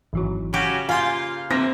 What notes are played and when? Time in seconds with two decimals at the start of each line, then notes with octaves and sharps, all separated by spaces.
0.13 G#1 E3 F#3
0.53 C#3 C#4 F#4 G4
0.89 A#3 F4 F5 G#5 C6 G6
1.50 F#2 C#3 E3 A#3 C4 A#6